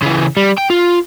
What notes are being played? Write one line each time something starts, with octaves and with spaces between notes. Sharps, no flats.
C#3 E3
G3
G5
F4